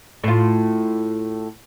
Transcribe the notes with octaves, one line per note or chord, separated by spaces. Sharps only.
A2 F4